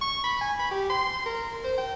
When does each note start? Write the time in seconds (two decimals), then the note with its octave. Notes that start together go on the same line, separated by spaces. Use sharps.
0.01 C#6
0.24 B5
0.41 G#5
0.59 B5
0.71 G4
0.90 C6
1.26 A#4
1.64 C5
1.78 G5